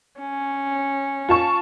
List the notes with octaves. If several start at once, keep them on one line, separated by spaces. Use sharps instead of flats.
C#4
F4 A5 C#6